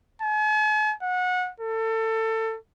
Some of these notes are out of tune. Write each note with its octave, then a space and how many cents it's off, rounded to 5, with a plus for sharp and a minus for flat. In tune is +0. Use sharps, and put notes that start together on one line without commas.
G#5 +45
F#5 -25
A4 +25